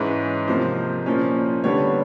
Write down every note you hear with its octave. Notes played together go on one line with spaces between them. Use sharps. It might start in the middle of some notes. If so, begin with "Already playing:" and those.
Already playing: G#2 E3 G#3 C#4 B4
C3 F3 A#3 C5
A#2 F3 A#3 C#4
D3 G3 B3 C#5